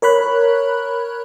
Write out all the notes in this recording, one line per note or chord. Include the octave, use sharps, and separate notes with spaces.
A#4 C#5 B5 F#6